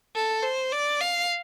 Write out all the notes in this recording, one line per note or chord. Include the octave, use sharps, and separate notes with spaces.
A4
C5
D5
F5